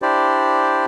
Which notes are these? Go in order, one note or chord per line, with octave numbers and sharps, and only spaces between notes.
D4 E4 G4 C5 D5